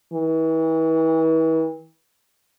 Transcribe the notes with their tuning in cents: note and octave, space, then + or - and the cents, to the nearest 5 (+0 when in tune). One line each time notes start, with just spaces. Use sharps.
E3 -35